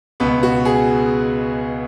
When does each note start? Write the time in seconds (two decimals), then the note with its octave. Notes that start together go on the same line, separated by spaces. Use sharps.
0.20 C#2 B2 B3
0.43 F#4
0.65 G#4